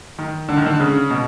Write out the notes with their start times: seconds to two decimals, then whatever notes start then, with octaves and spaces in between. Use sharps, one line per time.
0.19 D#3
0.49 D3
0.58 D#3
0.66 D3
0.80 C#3
1.10 B2